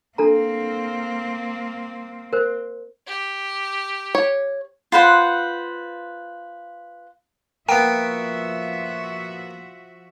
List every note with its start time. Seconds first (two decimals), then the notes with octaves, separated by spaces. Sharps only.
0.18 A#3 C4 D4 A4 A#5
2.33 A#4 C5
3.07 G4
4.15 C#5
4.92 F4 B4 C5 F#5
7.69 F3 A#3 B3 F#4 E5 G5 D7